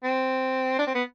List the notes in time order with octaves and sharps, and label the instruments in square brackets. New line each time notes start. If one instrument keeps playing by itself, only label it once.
[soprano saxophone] C4
D4
C4
B3